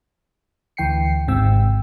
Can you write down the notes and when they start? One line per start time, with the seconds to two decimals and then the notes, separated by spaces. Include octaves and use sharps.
0.77 D2 E3 G5 C7 C#7
1.28 G#1 G#2 C3 C4 G5 E6